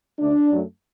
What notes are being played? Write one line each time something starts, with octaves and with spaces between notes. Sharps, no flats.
D2 D3 A3 D4
F#2 F#3 A3